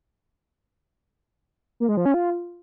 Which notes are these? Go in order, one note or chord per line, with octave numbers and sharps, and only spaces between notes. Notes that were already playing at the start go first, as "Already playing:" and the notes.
A#3
G#3
F3
C#4
F4